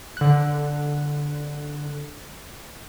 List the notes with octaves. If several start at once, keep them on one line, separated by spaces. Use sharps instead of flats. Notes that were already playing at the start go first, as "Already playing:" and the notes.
D3 F#6